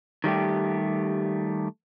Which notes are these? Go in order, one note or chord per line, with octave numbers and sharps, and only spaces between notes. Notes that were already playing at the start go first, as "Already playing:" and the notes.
D#3 G3 A3 G4